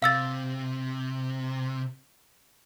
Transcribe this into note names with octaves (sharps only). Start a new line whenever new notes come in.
C3 F5 E6 A6